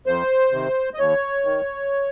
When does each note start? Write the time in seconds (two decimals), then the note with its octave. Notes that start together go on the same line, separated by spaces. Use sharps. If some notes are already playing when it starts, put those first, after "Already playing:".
0.06 F2 C5
0.52 C3 D#3
0.94 D#5
0.98 D#2 C#5
1.45 D#3